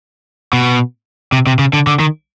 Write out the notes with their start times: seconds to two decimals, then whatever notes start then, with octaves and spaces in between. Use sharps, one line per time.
0.53 B2
1.32 C3
1.47 C3
1.59 C#3
1.73 D3
1.87 D3
2.00 D#3